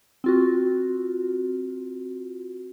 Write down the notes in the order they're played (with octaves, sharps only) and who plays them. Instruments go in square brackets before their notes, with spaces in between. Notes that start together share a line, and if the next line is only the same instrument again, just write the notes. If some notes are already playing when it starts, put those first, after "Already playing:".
[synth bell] C4 F4 F#4